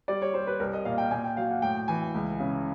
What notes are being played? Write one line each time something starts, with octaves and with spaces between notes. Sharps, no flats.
G3 D5
C#5
G3 C5
B4
C2 A#4
D#5
A#2 F5
G5
A#2 G#5
G5
F#3 F5
F#5
A2 G5
E3 G#5
C#2
C#3